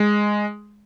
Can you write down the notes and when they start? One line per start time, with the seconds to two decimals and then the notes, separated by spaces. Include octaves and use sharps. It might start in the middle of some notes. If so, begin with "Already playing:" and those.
Already playing: G#3